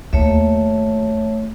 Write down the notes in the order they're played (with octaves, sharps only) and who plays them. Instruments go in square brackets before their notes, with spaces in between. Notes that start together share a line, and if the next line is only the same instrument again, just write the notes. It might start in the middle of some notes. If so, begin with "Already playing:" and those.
[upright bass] D#2 [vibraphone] A3 C#5 E5